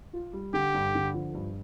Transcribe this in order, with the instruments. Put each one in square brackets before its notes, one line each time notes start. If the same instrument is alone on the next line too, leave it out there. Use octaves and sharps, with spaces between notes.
[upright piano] F4
G3
[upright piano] D3 [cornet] G4
[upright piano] G2
D3
F3
G2